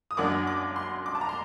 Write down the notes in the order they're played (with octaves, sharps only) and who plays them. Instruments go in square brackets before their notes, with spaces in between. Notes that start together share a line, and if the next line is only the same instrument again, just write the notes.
[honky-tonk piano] D#6
F#1 F#2 F#3 A#3 D4 D6
D6
C6
D6
A5
A#5
C6